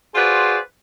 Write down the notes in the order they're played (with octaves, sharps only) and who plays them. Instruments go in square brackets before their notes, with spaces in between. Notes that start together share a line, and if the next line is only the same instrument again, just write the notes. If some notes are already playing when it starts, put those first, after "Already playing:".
[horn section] F4 F#4 G#4 B4 C5 D5